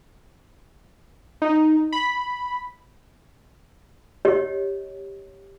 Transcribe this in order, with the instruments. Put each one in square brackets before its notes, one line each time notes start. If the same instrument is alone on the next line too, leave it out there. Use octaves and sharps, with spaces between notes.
[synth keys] D#4
B5
[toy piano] G4 C#5 D#5